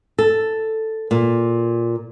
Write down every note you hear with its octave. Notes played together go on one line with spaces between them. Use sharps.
A4
A#2